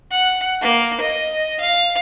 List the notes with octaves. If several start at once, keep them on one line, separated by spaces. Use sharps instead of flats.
F#5
A#3
D#5
F5